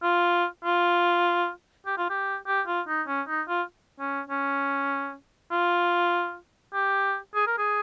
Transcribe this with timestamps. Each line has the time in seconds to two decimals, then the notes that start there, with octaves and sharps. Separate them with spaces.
0.03 F4
0.64 F4
1.86 G4
1.98 F4
2.10 G4
2.47 G4
2.67 F4
2.88 D#4
3.07 C#4
3.28 D#4
3.48 F4
4.00 C#4
4.30 C#4
5.51 F4
6.74 G4
7.35 G#4
7.47 A#4
7.58 G#4